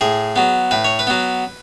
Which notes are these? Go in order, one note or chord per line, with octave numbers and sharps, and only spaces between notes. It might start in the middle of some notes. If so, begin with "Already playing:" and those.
A2 G#4
F#3 B3
A2 B4
C#5
B4
F#3 B3